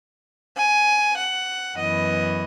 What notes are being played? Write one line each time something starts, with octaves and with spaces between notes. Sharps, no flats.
G#5
F#5
F#2 E3 B3 D#5